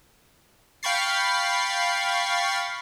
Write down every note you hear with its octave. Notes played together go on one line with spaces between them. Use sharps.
F5 G5 B5 C#6 A6 C7